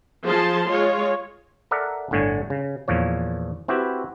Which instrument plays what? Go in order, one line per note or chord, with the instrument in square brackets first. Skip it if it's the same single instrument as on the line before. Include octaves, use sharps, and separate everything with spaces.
[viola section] F3 G#4 A5 C6
G#3 F4 C#5
[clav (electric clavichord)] A4 A#4 D5 E5 F#5
G1 A2 D3 C#5 G#5
C#3
E2 A#2 F3 C#5
C4 E4 F#4 G4 B4